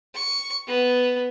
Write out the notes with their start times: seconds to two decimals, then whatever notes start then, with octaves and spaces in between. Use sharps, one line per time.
0.15 C#6
0.67 B3